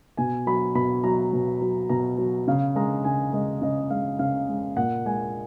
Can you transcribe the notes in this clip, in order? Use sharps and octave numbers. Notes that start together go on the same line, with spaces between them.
B2 G#5
F#3 B5
B2 B5
F#3 A#5
B2
F#3
B2 A#5
F#3
C#3 F5
G#3 A#5
C#3 G#5
G#3 D#5
C#3 D#5
G#3 F5
C#3 F5
G#3
A#2 F#5
G#3 G#5